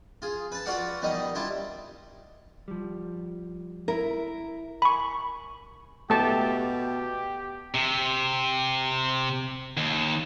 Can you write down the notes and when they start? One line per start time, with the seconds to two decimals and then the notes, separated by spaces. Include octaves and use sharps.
0.22 F4 G#4
0.52 B4 A5
0.66 F4 F#4 B4 D5 F5 F#5
1.02 B2 D#3 G3 D#4 D#5
1.35 G3 D4 E4 F4
2.68 F3 G3
3.88 E4 A#4 E5
4.82 G#5 B5 C#6
6.10 B2 A3 G4 A5
6.78 G4
7.74 C3
9.77 D#2